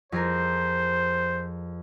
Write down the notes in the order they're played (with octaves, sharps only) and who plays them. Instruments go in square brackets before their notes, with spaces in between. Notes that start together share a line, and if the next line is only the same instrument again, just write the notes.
[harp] F2 G#4 A#4 [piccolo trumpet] C5